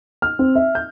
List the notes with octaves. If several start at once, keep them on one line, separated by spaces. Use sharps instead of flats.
F6
C4
E5
G6